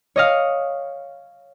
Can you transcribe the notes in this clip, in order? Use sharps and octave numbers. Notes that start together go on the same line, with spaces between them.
C#5 D#5 F5